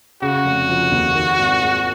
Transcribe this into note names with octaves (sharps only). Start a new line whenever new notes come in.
C#3 F#4
F1
F3
D#2
D#3
G#1
G#3